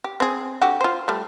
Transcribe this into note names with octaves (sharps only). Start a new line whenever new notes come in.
G4
C4 G#4
D3 F#4 G4
F4 C5
G3 A3